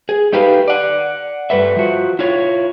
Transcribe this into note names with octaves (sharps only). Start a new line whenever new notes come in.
G#4
A3 D#4 G4 B4 F5
D5 F#5
G2 A3 B4 E5
F3 F#4
E4 F4 C#5